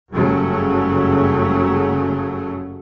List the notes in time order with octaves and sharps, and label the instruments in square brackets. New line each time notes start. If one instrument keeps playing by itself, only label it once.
[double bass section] F#1 G2 C#3 F#3 A3